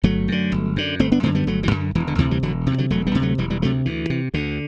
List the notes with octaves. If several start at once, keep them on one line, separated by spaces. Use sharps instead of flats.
G1 F#3 A3
F#2 D3
G1
F#2 D3
G1 A3 C4
B3 D4
F#2 D3 A3 C4
G3 B3
G1 F#3 A3
E3 G3
F#2 D3
E1 E3
D3
D2 C3 E3
E3 G3
E1 D3 F#3
D2 C3 E3
D3 F#3
E1 F#3 A3
G3 B3
D2 C3
F#3 A3
E1 E3 G3
E3 G3
D2 C3 F#3 A3
D2 E3
C3
D2 D3